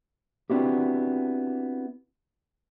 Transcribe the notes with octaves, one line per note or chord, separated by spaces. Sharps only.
B3 C4 D4 E4 F#4 G4